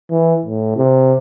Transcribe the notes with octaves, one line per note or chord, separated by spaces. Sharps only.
E3
A2
C3